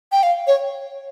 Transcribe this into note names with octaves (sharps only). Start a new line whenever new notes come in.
G5
F5
C#5